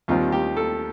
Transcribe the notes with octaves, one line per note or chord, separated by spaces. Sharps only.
D#2 D#3 G3 C4 F4
G4
A4